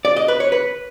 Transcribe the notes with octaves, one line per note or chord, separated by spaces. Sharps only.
D5
D#5
B4
C#5
B4